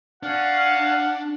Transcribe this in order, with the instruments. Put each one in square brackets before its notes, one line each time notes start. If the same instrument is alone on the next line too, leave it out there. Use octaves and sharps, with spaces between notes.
[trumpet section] C#4 F#4 F5 [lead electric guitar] D4 [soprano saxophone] F#5